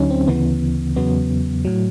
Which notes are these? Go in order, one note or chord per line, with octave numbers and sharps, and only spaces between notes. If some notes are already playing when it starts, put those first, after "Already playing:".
Already playing: D2 D3 F#3 C#4 D#4
C4
D2 C#3 E3 B3
E2 C#3 F#3 B3
A2 F#3